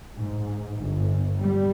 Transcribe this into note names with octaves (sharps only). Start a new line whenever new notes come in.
G#2
G1
G3